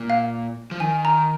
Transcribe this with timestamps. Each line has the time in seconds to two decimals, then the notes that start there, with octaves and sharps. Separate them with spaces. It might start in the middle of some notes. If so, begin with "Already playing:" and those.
Already playing: A#2
0.10 F5
0.71 F3
0.80 D#3 G#5
1.05 A#5